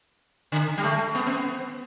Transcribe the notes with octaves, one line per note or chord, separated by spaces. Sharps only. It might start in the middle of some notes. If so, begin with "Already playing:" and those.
D3
G3
A3
B3
C4
B3